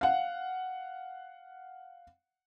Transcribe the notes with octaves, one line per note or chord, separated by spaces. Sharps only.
F5 F#5